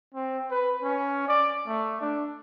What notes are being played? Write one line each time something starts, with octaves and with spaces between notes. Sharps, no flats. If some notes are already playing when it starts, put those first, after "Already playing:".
C4
B4
C#4
D5
A3
D4